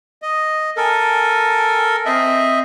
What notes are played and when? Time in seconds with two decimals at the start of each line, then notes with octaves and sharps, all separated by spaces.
0.22 D#5
0.77 A4 A#4 G#5
2.06 C4 D#5 E5